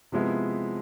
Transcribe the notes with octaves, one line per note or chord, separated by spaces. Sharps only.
C3 F3 G#3 B3 E4